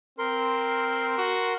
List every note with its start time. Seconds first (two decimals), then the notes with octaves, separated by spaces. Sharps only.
0.19 C4 A#4 C6
1.18 F#4